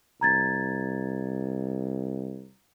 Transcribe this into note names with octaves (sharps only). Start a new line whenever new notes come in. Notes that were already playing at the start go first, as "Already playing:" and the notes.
C2 A#5 G#6 A6